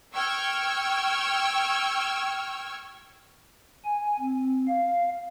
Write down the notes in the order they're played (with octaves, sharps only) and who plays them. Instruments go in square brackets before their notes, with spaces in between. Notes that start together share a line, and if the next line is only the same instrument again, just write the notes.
[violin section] G5 C#6 E6 F6 G#6
[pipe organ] G#5
C4
F5